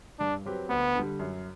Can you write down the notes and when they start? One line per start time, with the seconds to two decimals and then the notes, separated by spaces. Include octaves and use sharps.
0.20 G2 D4
0.46 F#3 C4 G4 B4
0.69 D2 B3
0.95 D3 G3
1.19 F#2